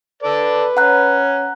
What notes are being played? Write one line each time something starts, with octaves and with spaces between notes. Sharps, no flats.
A4 B4 D5
C#4 F#5 A#5 F#6